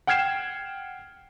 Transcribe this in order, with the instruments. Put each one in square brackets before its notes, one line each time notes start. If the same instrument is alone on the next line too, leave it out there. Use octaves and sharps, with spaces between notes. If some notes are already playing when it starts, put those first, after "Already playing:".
[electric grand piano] F#5 G5 F6 G#6 C7 E7